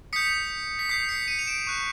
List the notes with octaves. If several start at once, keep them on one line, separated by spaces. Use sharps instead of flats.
D#6 G6 B6 C#7
B6
D#6 G6 C7
B6 C#7
C#7 D#7
F7
D7 E7
C#6 F#6